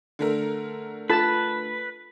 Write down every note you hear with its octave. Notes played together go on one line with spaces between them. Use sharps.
D3 A3 A#4
F4 A4 B4 A5